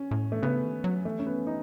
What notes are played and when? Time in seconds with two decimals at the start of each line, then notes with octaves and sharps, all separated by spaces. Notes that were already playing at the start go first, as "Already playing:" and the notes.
Already playing: C#4
0.11 A2
0.32 A3
0.42 C#3 B3
0.64 D#3
0.84 F#3
1.05 E3 A3
1.19 C#4
1.26 B3
1.47 D#4